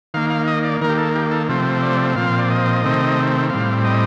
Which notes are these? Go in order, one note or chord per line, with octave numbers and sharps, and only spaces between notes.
D#3 A#3 F5
F5
D#5
D5
D#3 A#3 A#4
G4
A4
G4
A4
C3 F3 A3 C4
D5
A#2 F3 C4 F5
D5
D#5
C3 D#3 A3 C4
A2 G3 C4 F5
D#5